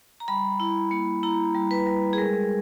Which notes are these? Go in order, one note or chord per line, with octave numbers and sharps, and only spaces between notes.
A#5
G3 B5
E4
A#3
E4 A#5
G3
B4
G3
G#4
G#3 A#4